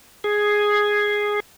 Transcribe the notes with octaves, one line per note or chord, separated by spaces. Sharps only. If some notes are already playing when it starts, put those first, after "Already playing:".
G#4